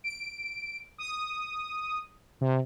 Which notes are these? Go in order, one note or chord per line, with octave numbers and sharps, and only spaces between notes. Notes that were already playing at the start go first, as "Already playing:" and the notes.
D7
D#6
C3